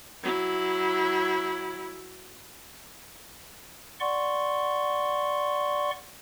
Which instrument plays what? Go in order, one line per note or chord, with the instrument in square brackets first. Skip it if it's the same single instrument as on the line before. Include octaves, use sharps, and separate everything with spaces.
[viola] F#3 E4
[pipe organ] D5 F#5 C6 C#6